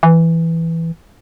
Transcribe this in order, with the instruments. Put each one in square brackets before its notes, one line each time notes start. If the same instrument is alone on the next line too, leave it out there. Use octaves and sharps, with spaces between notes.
[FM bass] E3